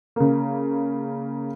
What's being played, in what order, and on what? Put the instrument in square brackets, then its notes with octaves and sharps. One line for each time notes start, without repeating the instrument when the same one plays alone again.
[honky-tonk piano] C#3 A#3